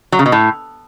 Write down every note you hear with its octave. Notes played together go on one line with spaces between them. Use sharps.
F#3
C#3
B2
A2